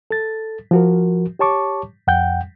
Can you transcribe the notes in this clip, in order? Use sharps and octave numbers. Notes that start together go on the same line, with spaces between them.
A4 A6
F3 F#4 A#4
G4 C#5 A5 C#6 D6
F2 F#5 G5 G6